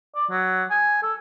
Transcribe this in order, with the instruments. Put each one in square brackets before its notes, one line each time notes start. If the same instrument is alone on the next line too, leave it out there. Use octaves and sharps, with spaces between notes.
[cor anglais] D5
F#3
G#5
A4